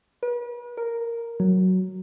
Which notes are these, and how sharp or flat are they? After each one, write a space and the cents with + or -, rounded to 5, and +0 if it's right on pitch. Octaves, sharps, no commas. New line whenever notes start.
B4 -40
A#4 -5
F#3 +5